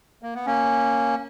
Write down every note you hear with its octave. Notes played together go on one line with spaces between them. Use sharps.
A#3
B3
A#3 C#4